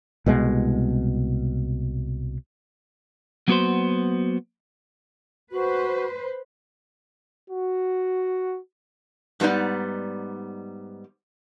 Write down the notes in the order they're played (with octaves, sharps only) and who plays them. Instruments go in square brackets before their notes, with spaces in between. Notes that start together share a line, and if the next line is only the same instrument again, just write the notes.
[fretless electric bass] C2 B2 G#3
[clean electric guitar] F#3 A#3 B3 F#4 B4 C5
[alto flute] F#4 [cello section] B4 C5
[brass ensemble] F#4
[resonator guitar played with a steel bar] G#2 G3 B3 D#4 D5